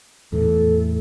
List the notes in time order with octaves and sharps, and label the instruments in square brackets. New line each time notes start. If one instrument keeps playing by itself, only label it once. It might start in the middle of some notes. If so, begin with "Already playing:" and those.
[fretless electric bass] E2 A2 E3 [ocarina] A4